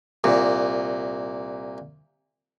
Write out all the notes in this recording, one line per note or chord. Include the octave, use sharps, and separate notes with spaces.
C2 A#2